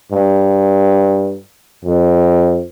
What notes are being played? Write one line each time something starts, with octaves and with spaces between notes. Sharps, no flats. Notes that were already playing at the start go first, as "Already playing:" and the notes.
G2
F2